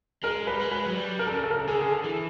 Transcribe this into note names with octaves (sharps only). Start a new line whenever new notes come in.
G#3 A#4
G3 B4
G#3
B4
F#3
G3
A#4
A4
C#3 A#4
A4
A#4
A4
D3 G#4
G#4
A4
E3